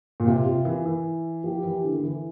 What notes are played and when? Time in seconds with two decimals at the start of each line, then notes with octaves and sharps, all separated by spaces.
0.20 A#2
0.26 C3 F4
0.46 C3
0.65 E3
0.86 E3
1.44 F3 G4
1.64 E3
1.84 D3
1.95 D3
2.04 E3